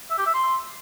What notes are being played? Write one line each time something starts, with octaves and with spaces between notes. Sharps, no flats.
E5
G4
E5
C6